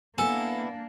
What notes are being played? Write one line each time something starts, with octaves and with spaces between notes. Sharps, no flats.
A#3 B3 D4 E4 A4 G#5